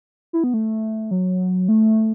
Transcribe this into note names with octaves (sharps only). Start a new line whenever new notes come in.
E4
B3
A3
F#3
A3